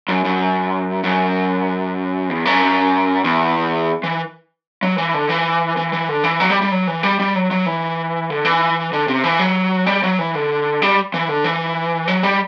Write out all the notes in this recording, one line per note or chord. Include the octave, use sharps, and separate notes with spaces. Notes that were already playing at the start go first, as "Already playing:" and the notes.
F#2
F#2
F#2
E2
F#2
E2
E3
F#3
E3
D3
E3
E3
E3
D3
E3
F#3
G3
G3
F#3
E3
G3
G3
F#3
F#3
E3
D3
E3
D3
C3
E3
F#3
G3
F#3
E3
D3
G3
E3
D3
E3
F#3
G3